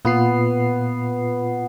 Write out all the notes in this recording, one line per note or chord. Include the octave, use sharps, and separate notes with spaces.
A#2 B3 F4 C7